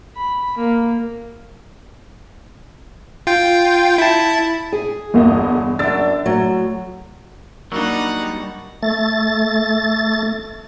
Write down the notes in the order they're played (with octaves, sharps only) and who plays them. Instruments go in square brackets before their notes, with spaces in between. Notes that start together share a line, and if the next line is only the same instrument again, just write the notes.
[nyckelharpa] B5
A#3
[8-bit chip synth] F4 G5
E4 A5
[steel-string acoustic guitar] G#4
[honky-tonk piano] G1 E2 D#5
[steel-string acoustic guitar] F#2 D4 [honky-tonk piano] E6 A6
[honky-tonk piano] A2 [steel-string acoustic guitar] F#3
[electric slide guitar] F#3 G3 [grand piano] A#3 D4 [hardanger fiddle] D#4 F#5
[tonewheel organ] A3 A6